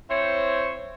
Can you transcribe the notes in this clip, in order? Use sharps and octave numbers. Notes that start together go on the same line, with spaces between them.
C4 E4 C5 C#5